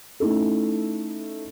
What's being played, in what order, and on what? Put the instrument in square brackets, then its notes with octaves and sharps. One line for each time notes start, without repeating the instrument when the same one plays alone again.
[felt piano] A3 C#4 D#4 E4 A4